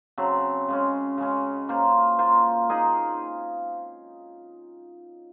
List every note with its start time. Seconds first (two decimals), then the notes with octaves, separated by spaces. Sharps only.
0.18 C#3 F#3 C4
0.68 C#3 G#3 C#4
1.18 C#3 G#3 C#4
1.69 A#3 F4 C5
2.19 A#3 F4 C5
2.69 A#3 D#4 G#4 D#5